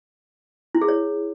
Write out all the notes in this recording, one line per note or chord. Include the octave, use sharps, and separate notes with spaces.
E4
G#4
C#5